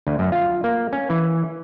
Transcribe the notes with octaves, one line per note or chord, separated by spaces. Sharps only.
D2
F#2
F4
A#3
C#4
E3